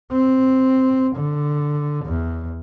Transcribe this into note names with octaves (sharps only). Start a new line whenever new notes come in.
C4
D3
E2